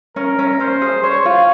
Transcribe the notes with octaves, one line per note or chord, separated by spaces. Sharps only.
C#4 A#4
C#4
C#4 C5
G#4
C5 C#5
F4